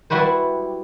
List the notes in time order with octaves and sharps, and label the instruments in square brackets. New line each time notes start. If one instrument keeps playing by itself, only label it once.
[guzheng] G3 E4 F#4 B4 C5